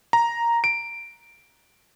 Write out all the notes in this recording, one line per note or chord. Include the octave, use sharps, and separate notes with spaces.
A#5
D7